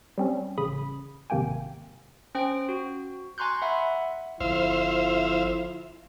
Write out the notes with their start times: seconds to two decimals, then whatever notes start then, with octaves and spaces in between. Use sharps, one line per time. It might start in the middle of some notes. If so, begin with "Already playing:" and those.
0.18 G3 C4 C#4
0.58 A1 C#3 B5 D#6
1.30 G#1 C3 A#3 G5 G#5
2.35 C#4 C5 G5 D7
2.69 F#4
3.38 G#5 A#5 C6 C#6 F#6 G6
3.62 E5 F#5 B5
4.40 G1 F2 F3 E4 C5 E5 F5